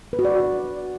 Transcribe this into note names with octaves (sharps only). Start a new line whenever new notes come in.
B4
F#4
D5